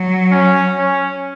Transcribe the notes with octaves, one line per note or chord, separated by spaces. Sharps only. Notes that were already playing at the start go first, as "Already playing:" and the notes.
Already playing: F#3
C#4
C#4